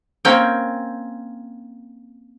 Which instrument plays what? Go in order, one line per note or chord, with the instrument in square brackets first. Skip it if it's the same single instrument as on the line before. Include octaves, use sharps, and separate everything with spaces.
[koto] A#3 C4 C#4 G5